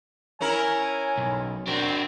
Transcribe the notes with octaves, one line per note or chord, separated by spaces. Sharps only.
C#4 E4 A#4 G#5
B1
C4 D4 F#4 A#4